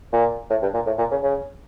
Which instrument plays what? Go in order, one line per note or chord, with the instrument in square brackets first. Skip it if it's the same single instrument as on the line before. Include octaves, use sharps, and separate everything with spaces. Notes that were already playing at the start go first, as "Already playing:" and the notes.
[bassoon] A#2
A2
G2
A#2
A2
A#2
C#3
C#3